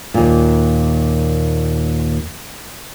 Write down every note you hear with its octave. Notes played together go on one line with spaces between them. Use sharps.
D#2 A#2